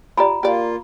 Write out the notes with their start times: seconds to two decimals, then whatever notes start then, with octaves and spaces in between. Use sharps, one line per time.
0.17 F4 G4 D5 A#5 B5
0.43 A#3 F4 G4 D5